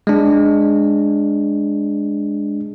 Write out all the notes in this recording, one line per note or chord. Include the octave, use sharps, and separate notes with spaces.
G#3 D4